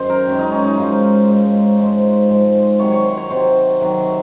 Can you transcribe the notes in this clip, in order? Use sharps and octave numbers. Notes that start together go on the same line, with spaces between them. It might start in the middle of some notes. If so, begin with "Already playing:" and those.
Already playing: F#2 D#3 C5
A#4
F#2 D#3 G#3 C#4
D#4
C#4
D#4
G#2 F3 G#3 F4
G#2 F3 G#3
G#2 F3 G#3
G#2 F3 G#3
C3 D#3 F#3 C#5
C#5
C5
C#5
C3 D#3 F#3 C5
C3 D#3 F#3